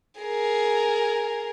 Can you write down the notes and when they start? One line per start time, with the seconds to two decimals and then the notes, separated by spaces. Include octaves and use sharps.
0.21 G#4 A#4